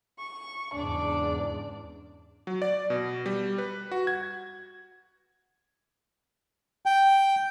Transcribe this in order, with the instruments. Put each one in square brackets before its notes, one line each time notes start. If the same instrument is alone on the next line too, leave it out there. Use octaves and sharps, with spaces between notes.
[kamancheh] C#6
[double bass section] E2 G#2 C#3 [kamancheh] D4 D5
[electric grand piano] F#3
D5
B2
G3
B4
F#4
G#6
[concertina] G5